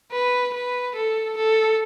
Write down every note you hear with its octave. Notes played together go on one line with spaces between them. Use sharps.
B4
B4
A4
A4